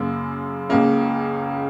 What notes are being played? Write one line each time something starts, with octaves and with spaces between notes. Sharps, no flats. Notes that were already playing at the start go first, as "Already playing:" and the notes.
Already playing: F#2 C#3 A#3
C#2 C#3 A#3